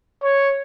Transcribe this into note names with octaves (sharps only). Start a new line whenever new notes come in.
C#5